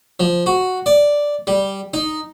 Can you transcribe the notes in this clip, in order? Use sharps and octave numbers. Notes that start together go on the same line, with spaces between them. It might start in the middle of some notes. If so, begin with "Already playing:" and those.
F3
F#4
D5
G3
D#4